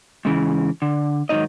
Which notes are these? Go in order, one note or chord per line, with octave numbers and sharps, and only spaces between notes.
G#2 C#3 E3
D3
G#2 D#3 E3 F#3 D#4 D#5